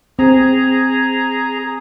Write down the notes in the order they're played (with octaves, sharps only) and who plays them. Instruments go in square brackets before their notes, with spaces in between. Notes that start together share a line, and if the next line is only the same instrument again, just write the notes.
[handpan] C4 [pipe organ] G#4 A#5